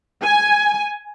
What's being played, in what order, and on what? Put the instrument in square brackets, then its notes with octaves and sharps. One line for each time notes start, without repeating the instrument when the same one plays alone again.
[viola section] G#5